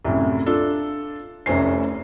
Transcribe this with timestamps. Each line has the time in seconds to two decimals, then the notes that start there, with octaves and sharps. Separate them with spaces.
0.04 C2 F#2 A2
0.46 D4 F4 A4
1.46 F1 C2 A3 C#4 C5 C7